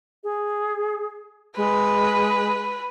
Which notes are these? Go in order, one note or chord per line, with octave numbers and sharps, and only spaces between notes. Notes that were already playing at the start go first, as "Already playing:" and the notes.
G#4
G#3 B4